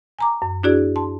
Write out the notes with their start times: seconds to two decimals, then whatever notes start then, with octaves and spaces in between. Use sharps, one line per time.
0.19 G#5 A#5 D6
0.42 F#2
0.63 D4 E4 F#4 G#4 D5
0.96 A5 C6